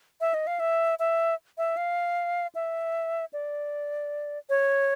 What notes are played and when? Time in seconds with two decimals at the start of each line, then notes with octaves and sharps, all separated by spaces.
0.21 E5
0.34 D#5
0.47 F5
0.60 E5
0.99 E5
1.58 E5
1.77 F5
2.55 E5
3.33 D5
4.49 C#5